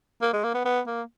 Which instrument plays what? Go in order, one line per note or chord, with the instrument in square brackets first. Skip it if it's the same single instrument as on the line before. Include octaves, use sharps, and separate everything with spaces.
[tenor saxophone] A#3
G#3
A#3
B3
B3
A#3